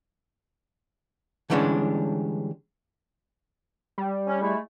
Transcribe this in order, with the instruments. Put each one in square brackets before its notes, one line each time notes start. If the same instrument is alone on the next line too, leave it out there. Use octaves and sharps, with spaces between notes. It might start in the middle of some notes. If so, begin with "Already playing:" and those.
[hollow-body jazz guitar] D3 E3 G3 G#3 C#4 D4
[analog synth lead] G3
[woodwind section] C#4
G#3 A3 E4